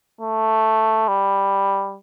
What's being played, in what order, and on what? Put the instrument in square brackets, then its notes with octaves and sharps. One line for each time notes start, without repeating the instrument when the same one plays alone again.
[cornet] A3
G3